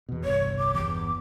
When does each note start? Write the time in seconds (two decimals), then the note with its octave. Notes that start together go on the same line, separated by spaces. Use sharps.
0.09 E2 B2
0.24 G1 C2 C#5
0.59 D6
0.74 G1 E2 D6